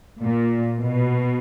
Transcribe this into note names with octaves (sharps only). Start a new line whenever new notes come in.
A#2
B2